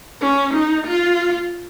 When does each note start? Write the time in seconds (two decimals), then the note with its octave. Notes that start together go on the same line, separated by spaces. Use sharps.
0.21 C#4
0.54 D#4
0.86 F4